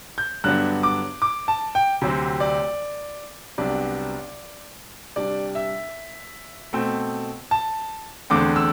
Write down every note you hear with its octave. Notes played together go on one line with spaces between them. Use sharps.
G6
G2 D3 F#3 B3 D4 F#6
D6
D6
A5
G5
D2 C3 F#3 C4
D5
C2 C3 F#3 B3 D4 D5
C3 G3 D4 D5
E5
B2 A3 C4
A5
E2 D3 A3 C4 D6
E6